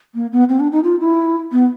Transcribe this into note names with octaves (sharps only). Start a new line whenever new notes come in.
A#3
B3
C4
D4
D#4
F4
E4
B3